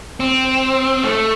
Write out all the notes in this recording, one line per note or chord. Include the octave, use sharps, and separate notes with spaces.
C4
A3